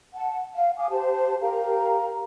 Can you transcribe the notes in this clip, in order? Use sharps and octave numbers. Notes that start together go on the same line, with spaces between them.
F#5 A5
F5
F5 G#5 D6 D#6
G4 C5 A5
G4 A#4 F5 A#5